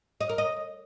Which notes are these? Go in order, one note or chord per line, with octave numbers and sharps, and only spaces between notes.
D#5
A#4
D#5